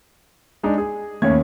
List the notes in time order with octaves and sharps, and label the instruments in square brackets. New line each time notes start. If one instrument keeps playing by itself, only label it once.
[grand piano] G#3 D4 D#4
G#4
[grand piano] D#2 C#4 G#6 [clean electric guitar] A3 A#3 C#5